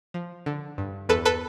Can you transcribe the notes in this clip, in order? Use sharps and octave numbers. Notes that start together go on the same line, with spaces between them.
F3
D3
G2
E2 A4 B4
A4 B4